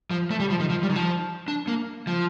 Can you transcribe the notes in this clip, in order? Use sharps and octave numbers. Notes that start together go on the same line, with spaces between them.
F3
A3
G3
F3
D#3
F3
G3
D#3
F3
D4
A#3
F3